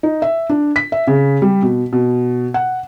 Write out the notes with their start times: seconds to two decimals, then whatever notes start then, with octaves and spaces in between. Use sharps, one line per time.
0.03 D#4
0.22 E5
0.50 D4
0.76 B6
0.92 E5
1.07 C#3
1.42 G3
1.62 B2
1.92 B2
2.54 F#5